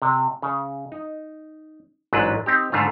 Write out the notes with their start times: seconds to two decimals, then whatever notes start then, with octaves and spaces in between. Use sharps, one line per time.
0.02 C3
0.42 C#3
0.92 D#4
2.13 A1 G#2 F#3 D4 B4
2.46 C4 D#4 G4
2.72 G#2 D3 A3 F4